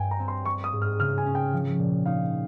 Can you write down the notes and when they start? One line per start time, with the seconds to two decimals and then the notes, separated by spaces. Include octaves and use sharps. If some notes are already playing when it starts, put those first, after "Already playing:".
Already playing: G2 G3 G5 G#5
0.11 A#5
0.19 C4
0.28 C6
0.45 G3 C#6
0.64 D#6
0.73 G#2
0.82 F6
0.99 C#3 F6
1.18 G#5
1.26 C#4
1.35 G5
1.53 F3
1.79 A#2
2.06 D#4 F5